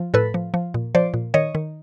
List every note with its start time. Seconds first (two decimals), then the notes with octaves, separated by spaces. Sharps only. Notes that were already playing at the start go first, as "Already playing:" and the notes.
Already playing: F3
0.14 A2 A4 B4
0.34 F3
0.54 F3
0.74 A#2
0.95 F3 C5 D5
1.14 A#2
1.34 D#3 C#5 D#5
1.55 D#3